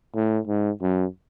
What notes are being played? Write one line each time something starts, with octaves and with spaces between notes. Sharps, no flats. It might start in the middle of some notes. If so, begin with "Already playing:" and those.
A2
G#2
F#2